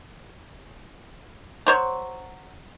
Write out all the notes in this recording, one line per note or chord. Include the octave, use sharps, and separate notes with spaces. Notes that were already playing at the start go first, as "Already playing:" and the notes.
F#3 C5 C#5